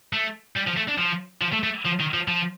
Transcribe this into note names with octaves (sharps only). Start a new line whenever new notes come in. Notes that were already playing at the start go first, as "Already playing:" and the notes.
A3
G3
F3
A3
D4
F3
F3
A3
A3
F3
D#3
F3
F3